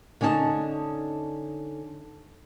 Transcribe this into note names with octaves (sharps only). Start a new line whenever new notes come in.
D3 C#4 D#4 C#5 A5